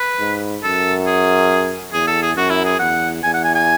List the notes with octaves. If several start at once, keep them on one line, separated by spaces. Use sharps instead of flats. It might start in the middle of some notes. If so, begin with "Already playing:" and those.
Already playing: B4
G#2
F#2 A4
G#4
E2 G#4
A4
G#4
F#2 F#4
E4
G#4
E2 F#5
E2 G#5
F#5
G#5
G#5